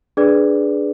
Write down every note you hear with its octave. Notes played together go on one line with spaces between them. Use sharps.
D4 G#4 B4 D5